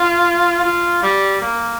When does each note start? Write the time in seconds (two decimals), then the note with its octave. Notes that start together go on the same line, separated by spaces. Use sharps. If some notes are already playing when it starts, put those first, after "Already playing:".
Already playing: F4
0.63 F4
1.03 G3
1.41 A#3